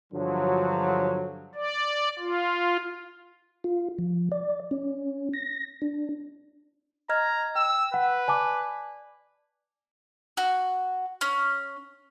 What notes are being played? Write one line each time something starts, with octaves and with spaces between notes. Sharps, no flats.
G2 D3 F3 F#3
D5
F4
F4
F3
D5
C#4
A#6
D4
D#5 A#5 F6 G#6
G5 E6
B4 F#5
D5 G#5 A5 D6
F#4
C#4